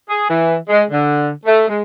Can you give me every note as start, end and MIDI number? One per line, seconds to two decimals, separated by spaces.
0.09 0.27 68
0.29 0.56 52
0.69 0.82 56
0.91 1.29 50
1.46 1.65 57
1.68 1.82 56